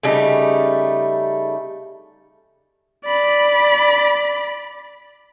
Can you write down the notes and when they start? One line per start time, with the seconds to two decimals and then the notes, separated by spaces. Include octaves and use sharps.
0.03 C#3 G3 A3 D#4
3.05 D5 B5